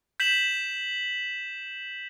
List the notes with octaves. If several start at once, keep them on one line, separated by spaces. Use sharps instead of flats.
G6 B6 E7 F#7